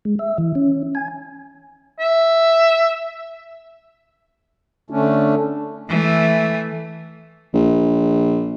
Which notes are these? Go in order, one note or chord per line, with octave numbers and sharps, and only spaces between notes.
G#3
E5
E3
C#4
G#5
E5
D3 A3 C#4 D4
E3 A3
A#1